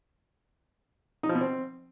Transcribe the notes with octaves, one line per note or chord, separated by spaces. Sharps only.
D#4
F3
B2
C4